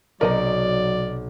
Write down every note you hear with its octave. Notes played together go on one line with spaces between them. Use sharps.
B1 C3 F#3 A#4 D5 D#5 A#5 D6